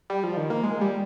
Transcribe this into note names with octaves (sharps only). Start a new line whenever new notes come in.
G3
F3
D#3
A#3
G#3
G3